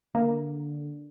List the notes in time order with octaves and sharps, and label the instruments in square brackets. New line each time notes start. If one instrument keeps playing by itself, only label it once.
[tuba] D3 [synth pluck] A#3